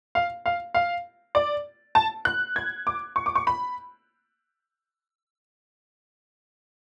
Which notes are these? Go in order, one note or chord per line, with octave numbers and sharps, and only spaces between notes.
F5
F5
F5
D5
A5
F#6
G#6
D6
C#6
D6
C#6
B5